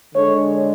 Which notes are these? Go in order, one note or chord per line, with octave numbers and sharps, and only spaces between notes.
D3 G#3 D4 A4 C#5